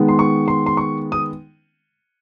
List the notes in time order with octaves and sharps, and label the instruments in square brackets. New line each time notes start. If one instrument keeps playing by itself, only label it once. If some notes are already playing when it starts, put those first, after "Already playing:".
Already playing: [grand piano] D#3 G#3 B3
C6
C#6
C6
C6
C#6
D#6